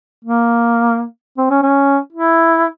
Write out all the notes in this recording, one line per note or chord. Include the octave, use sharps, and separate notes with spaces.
A#3
C4
C#4
C#4
E4